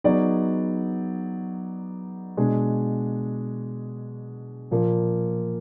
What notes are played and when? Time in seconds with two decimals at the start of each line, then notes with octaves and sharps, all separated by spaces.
0.04 F#3 B3 D#4 G#4 D5
2.37 B2 G#3 D4 G#4
4.71 A#2 F3 A#3